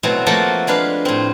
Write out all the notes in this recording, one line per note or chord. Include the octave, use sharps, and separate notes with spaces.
B2 F#3 A3 C4 E4
F3 A3 A#3 F#4 A4
G#3 D4 B4 F5
A2 C4